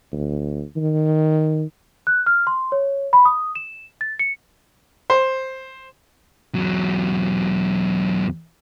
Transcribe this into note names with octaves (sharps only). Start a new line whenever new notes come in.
D2
D#3
F#6
F6
C6
C#5
B5
D#6
E7
A6
C#7
C5
E2 F#3